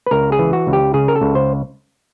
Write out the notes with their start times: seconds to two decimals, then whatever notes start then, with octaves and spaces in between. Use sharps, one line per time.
0.07 B4
0.11 C#2 A#4
0.32 G#4
0.39 E3
0.53 F#4
0.67 C#2
0.73 G4
0.94 C#3 G#4
1.08 A#4
1.16 A4
1.21 C#2
1.35 C5